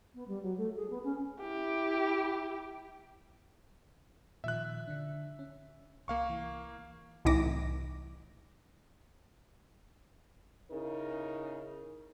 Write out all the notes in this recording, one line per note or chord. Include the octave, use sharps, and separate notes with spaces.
B3
G3
F#3
A3
G#4
B3
C#4
E4 G4
A#2 D#3 F3 E5 F#6
D3 D4
C#4
C2 A#3 F5 C#6
E3
C2 A2 E3 D#4 D6 A#6
C#3 D#4 E4 A#4